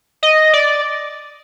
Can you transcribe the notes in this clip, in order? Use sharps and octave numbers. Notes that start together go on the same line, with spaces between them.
D#5
D5